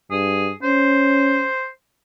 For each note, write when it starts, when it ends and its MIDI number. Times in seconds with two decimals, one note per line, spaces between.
0.11 0.51 43
0.11 0.52 68
0.63 1.48 61
0.63 1.68 72